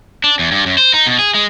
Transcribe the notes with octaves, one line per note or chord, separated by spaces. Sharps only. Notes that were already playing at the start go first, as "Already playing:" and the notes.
D4
E2
G2
F#2
C5
D#4
B2
G#4
G#3